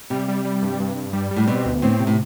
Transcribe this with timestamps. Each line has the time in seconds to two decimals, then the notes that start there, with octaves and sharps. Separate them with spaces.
0.10 C3 G3
0.28 G3
0.45 G3
0.63 G2
0.80 G2
0.96 G2
1.13 G3
1.31 G3
1.36 A2
1.47 B2 C4
1.65 D2
1.82 A2 C4
2.00 C3
2.07 A2